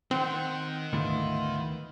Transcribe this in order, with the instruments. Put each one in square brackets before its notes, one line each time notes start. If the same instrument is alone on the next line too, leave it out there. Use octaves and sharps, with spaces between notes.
[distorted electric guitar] D#3 [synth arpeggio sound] C4 [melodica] C5 F#5
[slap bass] D2 G#2 D3 [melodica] B3 E4 F4